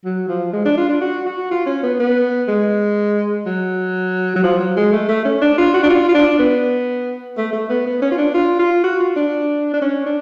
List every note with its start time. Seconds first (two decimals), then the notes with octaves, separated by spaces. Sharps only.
0.05 F#3
0.29 F3
0.53 G#3
0.66 D4
0.78 F4
0.89 D4
1.01 F#4
1.26 F#4
1.51 F4
1.66 C#4
1.83 B3
1.99 B3
2.48 G#3
3.46 F#3
4.36 F#3
4.44 F3
4.60 F#3
4.77 G#3
4.92 A3
5.09 A3
5.25 C#4
5.41 D4
5.58 F4
5.74 F#4
5.83 D4
5.90 F4
6.08 F4
6.15 D4
6.39 B3
7.38 A3
7.53 A3
7.69 B3
7.86 B3
8.02 C#4
8.11 F4
8.18 D4
8.34 F4
8.59 F4
8.84 F#4
9.00 F4
9.16 D4
9.74 D4
9.82 C#4
10.06 D4